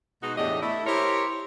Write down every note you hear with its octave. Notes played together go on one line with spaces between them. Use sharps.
B2 G#3 D#4 F#4
E2 A2 D4 G4 D#5
A3 E4
E4 G4 A#4 C5 C#5